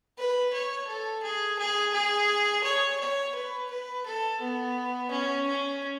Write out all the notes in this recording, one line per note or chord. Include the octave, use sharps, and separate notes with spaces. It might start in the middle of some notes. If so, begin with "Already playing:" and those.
B4
C#5
A4
G#4
G#4
G#4
C#5
C#5
B4
B4
A4
B3
C#4
C#4